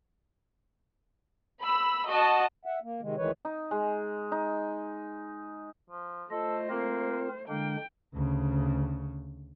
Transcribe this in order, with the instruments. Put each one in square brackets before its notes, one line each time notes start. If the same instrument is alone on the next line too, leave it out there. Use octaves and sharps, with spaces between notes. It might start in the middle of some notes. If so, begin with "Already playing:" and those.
[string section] B5 E6
F#4 D#5 A5
[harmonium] E5 F#5
A#3
C3 D#3 G#3
D2 D#3 E3 G#3 B4 C#5
[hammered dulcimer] D#4
G#3
D#4
[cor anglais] F3
[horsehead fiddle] A3 C5 [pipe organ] F4 D#5 [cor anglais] A4
[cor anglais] A#3 [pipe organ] C4 F4 A#4
[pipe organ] D3 G#3 D4 [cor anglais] A#3 [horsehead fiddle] G5
[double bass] D2 C#3